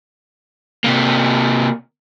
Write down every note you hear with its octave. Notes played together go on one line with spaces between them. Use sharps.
C3 A#3